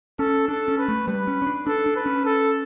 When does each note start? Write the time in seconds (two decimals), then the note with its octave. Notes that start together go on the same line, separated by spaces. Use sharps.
0.19 C#4 A4
0.48 D4 A4
0.68 C#4
0.78 B4
0.88 A3
1.08 G3 B4
1.27 C#4
1.42 C#4
1.47 D4
1.67 D4 A4
1.86 D4
1.96 B4
2.06 C#4
2.26 A4